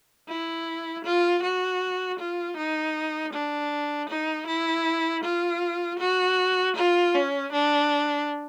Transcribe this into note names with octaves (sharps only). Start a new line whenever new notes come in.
E4
F4
F#4
F4
D#4
D4
D#4
E4
F4
F#4
F4
C#4
D4